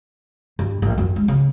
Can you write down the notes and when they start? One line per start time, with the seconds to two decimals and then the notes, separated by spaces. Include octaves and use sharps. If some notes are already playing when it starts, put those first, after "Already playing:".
0.59 G2
0.82 A1
0.98 F#2
1.16 G#3
1.28 C#3